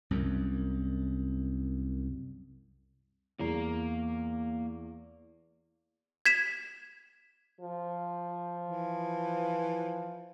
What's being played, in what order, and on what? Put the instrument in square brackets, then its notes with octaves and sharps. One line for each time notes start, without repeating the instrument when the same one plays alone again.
[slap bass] C2 F#2
[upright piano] E2 [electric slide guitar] A#3 A#5
[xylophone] G#6 B6 E7
[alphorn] F3
[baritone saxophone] E3